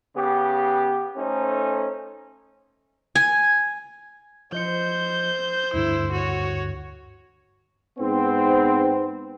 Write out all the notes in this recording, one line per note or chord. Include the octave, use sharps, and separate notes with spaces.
C#3 B3 G4
A3 C#4 D#4 A4 C5
G#5
F3 C5 D#5 G6 C#7
D2 G2 D3 E4
F#4 C#5
G#2 B3 C4